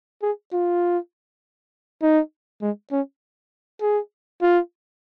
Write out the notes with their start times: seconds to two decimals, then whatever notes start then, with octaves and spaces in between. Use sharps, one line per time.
0.22 G#4
0.53 F4
2.02 D#4
2.62 G#3
2.92 C#4
3.81 G#4
4.42 F4